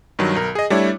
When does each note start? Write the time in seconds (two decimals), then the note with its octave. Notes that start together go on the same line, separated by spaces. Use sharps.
0.19 G2 D#3 F#3
0.35 B1 A#4
0.55 G#4 D#5
0.70 G3 A3 D4 E4 C#5